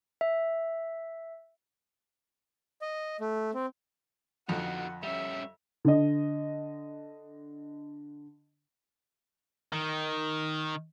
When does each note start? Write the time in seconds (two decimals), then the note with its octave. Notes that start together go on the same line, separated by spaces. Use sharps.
0.21 E5
2.82 D#5
3.21 A3
3.54 C4
4.49 F2 D3 D#4 F#4 F#5
5.03 G3 C#4 E5
5.85 D3 D#5
9.73 D#3